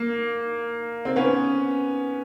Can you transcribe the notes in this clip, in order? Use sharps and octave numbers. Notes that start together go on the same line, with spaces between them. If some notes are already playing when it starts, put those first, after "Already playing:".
Already playing: A#3
C4
B3 C#4